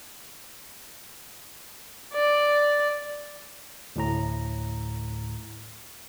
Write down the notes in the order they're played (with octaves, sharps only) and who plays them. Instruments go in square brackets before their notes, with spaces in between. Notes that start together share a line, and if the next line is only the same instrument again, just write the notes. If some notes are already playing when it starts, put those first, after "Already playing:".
[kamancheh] D5
[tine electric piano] D2 A2 A#5